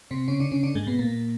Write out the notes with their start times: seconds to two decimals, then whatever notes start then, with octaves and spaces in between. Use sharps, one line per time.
0.11 C3 C4
0.28 C#3 C#4
0.40 D3 D4
0.52 C#3 C#4
0.63 D3 D4
0.75 G#2 G#3
0.87 B2 B3
0.99 A#2 A#3